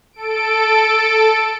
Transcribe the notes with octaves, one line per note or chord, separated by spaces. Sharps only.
A4 D7